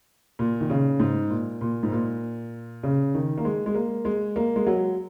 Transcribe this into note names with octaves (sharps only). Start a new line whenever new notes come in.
A#2
D#3
C#3
G#2
A#2
A#2
G#2
A#2
C#3
D#3
A#3
G#3
G#3
A#3
G#3
A#3
G#3
F#3